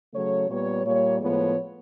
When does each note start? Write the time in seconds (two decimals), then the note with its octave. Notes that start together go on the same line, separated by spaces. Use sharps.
0.14 C#3 F#3 A3 C#5
0.49 A#2 G3 B3 C#5
0.84 A#2 G3 A#3 C#5
1.20 A2 F3 G#3 B3 C#5